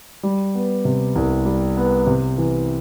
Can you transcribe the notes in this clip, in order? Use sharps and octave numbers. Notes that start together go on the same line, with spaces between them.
G3
B3
C3
C2
G3
B3
C3
E3